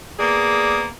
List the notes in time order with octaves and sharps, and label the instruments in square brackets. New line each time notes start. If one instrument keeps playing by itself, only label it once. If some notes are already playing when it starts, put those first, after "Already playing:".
[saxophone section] A#3 B3 G#4 D5